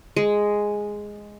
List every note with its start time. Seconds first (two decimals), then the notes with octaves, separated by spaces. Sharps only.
0.16 G#3